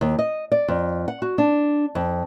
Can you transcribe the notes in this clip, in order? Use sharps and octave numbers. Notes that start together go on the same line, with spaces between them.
D#2
D#5
D5
F2
F#5
F#4
D4
F2